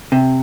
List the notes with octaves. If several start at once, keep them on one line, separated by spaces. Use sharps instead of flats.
C3